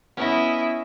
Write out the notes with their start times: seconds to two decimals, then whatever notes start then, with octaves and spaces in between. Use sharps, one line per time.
0.17 B3 C#4 E4 D#5